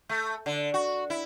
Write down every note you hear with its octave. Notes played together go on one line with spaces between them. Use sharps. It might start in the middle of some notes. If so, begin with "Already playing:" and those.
A3
D3
F#4
E4